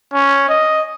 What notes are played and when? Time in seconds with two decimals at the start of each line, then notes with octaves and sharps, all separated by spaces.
0.14 C#4
0.49 D#5